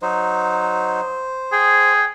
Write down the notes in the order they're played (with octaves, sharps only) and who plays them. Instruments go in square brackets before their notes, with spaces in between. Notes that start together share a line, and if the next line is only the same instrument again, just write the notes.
[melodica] F#3 D#4 [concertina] C5
[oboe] G#4 [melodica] G5